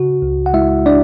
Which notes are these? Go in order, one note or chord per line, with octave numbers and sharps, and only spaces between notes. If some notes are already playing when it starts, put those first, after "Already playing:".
Already playing: C#3 F#4
C#2
F#5
G#3 E4 E5
D4 D5